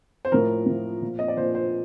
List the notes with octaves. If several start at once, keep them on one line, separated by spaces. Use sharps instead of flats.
C5
A2 F3 A#4
A2 F3
A#2 F3
D#5
D5
A#2 F3 C5
C5